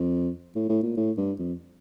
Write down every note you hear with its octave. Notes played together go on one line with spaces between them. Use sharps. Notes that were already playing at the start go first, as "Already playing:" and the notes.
Already playing: F2
A2
A2
A#2
A2
G2
F2